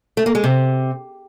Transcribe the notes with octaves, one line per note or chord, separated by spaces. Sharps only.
A3
A#3
G#3
C3